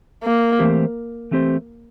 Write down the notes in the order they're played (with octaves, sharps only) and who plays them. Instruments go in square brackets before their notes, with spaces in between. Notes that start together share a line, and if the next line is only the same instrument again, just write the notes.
[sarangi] A#3
[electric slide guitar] E3 A3 C4 G4 C5
E3 A3 C4 G4 C5